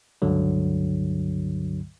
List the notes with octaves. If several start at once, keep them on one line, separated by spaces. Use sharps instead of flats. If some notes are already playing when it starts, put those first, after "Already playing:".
C#2 G2 D3 F#3